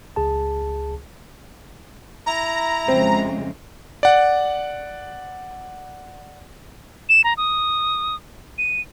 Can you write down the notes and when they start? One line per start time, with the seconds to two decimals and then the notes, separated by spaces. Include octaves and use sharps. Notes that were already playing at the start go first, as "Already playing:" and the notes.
0.16 C#2 G#4 A5
2.26 E4 A#5
2.88 F2 C#3 G#3 C4
4.03 D5 F#5
7.09 E7
7.24 A#5
7.37 D#6
8.58 D#7